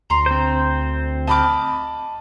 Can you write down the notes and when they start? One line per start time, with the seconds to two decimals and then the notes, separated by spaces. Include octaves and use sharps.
0.10 D2 A#5 C6
0.26 C4 C5
1.27 D#5 A5 B5 D6 F6